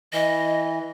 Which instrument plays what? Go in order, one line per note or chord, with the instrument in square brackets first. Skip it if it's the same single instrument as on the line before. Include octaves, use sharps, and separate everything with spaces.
[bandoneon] E3 [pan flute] D#5